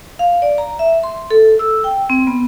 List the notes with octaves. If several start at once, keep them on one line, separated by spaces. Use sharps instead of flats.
F5
D5
A#5
E5
C6
A4
E6
G5
C4
B3